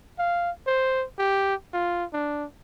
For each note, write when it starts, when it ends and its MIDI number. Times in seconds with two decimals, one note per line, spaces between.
0.19 0.51 77
0.67 1.05 72
1.18 1.55 67
1.73 2.05 65
2.13 2.45 62